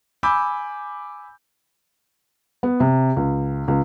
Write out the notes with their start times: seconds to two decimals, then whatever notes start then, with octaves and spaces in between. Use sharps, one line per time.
0.23 G#5 B5 D6 E6 G6
2.63 B3
2.80 C3
3.16 C#2
3.68 C#2